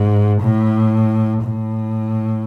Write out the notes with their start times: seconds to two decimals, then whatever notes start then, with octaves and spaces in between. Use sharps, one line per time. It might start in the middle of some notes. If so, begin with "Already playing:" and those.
Already playing: G#2
0.42 A2
1.44 A2